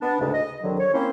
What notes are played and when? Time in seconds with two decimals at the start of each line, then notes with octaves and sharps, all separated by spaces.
0.02 B3 D4
0.19 D2 G#2 C#3
0.33 D#5
0.63 C2 D3 D#3 F#3
0.79 C#5
0.94 A#3 C4 C#4 E4 C5